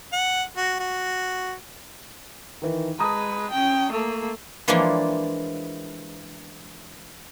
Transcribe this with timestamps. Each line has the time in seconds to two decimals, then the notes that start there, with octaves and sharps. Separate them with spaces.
0.12 F#5
0.57 F#4
0.80 F#4
2.62 D#3 E3
2.99 G#3 B4 A5 A#5 D#6
3.51 C#4 G5
3.91 A3 A#3
4.68 E3 F3 G#3 A#3 D4 F4